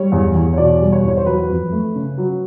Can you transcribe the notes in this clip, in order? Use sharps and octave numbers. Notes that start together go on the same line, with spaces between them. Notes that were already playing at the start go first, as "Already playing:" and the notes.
Already playing: G3 C#5
E2
E2
C#5
B2 D5
G3
C#5
E2 C#5
C5
F#3 B4
F2
A3
C#3
F#3